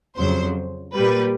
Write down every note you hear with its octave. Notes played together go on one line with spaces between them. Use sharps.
F2 C#3 F#3 C5
A#2 G3 A#3 B4